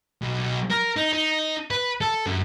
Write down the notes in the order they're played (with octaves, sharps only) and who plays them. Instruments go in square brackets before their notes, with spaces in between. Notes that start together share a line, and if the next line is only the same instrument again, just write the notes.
[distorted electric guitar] B1
A#4
D#4
D#4
B4
A4
F#2